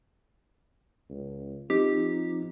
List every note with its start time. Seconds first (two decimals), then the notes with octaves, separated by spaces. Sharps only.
1.10 C#2
1.70 F3 C4 D#4 G4